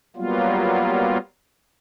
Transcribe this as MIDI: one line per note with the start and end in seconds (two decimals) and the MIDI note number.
0.16 1.18 54
0.16 1.18 55
0.16 1.18 58
0.16 1.18 59
0.16 1.18 65